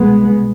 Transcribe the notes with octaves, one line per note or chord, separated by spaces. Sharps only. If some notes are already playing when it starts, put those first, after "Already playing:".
Already playing: C2 B2 G#3 B3